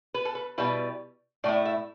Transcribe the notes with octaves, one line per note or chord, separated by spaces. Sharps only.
B4
A4
B4
B2 G3 E4 B4
A2 A3 E4 D5
E5